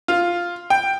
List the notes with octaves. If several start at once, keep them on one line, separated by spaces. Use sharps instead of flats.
F4
G5